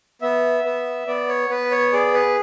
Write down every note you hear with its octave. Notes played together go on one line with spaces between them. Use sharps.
B3 E5
B3
B3 D5
C#5
B3 B4
C#5
G#4 D5
B4